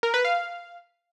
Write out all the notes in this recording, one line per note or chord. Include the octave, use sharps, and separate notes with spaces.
A#4
B4
F5